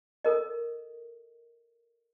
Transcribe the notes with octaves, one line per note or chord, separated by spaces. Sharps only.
A4 A#4 D#5